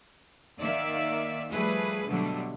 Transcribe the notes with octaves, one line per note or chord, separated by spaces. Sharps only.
D#3 A#3 D5 E5
F3 G3 A3 G#4 B4
B2 D3 F#3 G3 A3